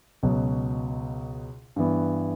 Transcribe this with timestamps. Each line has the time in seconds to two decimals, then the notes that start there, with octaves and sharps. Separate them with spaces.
0.23 C#2 B2 F#3
1.76 G2 E3 B3